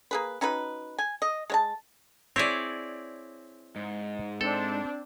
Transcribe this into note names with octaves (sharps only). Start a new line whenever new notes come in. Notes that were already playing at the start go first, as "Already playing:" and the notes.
A#3 G#4 B4
C#4 D#4 F#4 B4
G#5
D#5
G#3 C#5 A5
C4 E4 G#4 C#5 D5
G#2
C4 D4 A4